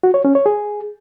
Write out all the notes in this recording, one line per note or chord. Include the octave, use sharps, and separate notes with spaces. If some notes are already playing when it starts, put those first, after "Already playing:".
F#4
C#5
C#4
C#5
G#4